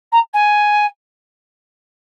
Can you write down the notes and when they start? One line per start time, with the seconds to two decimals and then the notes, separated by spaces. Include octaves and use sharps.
0.12 A#5
0.33 G#5